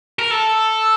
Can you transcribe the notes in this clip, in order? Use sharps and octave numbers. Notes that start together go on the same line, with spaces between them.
A#4
A4